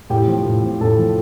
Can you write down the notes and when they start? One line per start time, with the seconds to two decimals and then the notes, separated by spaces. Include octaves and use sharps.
0.10 A2 G4 G5
0.28 F3
0.45 A2
0.63 F3
0.81 A2 A4 A5
0.99 F3